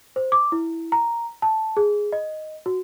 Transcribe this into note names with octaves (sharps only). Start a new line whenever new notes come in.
C5
D6
E4
A#5
A5
G#4
D#5
F#4